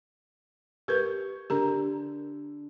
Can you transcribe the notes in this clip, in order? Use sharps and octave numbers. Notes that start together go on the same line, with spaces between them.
G4 A#4 B4 C#6 G6 G#6
D3 G4 A#4 A#5